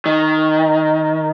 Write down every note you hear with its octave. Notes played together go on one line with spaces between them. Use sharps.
D#3